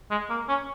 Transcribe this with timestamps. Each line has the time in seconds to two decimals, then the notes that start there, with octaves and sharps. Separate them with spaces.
0.11 G#3
0.30 A#3
0.49 C#4